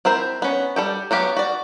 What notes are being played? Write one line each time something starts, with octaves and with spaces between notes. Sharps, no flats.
C4 E4 A#4 C5
B3 C#4
G3 A4 G5
F#3 B3 G4 F5
F#4 D5